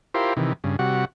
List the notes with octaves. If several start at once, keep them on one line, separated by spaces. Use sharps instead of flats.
E4 F4 G4 A#4 C5
C3 D#3 E3
G2 C#3
C3 G3 F#4 F#5